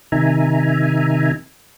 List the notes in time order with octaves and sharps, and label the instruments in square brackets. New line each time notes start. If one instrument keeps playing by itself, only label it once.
[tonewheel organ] C3 D#3 D#4 E5 G#5 A#5